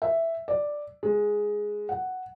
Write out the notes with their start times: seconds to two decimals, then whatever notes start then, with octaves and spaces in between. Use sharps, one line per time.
0.02 E5
0.48 D5
1.03 G#3
1.89 F#5